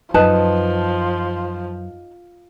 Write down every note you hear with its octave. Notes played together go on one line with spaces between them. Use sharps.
F#2 F3 D#4 B4 A5